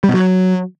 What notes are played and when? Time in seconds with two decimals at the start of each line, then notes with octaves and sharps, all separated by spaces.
0.04 G3
0.09 B2
0.14 F#3